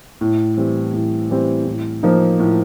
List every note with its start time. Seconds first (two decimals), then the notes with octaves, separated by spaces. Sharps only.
0.21 A2
0.57 E3 G3 C4
0.94 A2
1.30 E3 G3 C4
1.66 A2
2.03 F3 A#3 D#4
2.39 A2